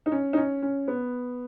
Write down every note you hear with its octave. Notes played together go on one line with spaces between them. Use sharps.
D#4
C#4
D#4
C#4
C#4
B3